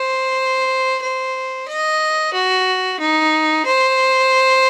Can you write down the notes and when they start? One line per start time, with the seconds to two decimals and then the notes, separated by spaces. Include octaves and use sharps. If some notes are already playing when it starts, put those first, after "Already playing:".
Already playing: C5
1.02 C5
1.68 D#5
2.33 F#4
3.00 D#4
3.66 C5